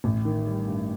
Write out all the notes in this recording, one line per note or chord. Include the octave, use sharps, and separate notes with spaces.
A1
D#3
G3
G2